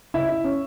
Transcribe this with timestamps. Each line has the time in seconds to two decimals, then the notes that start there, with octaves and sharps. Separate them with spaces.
0.14 C#3 E4 E5
0.29 E4
0.44 C#4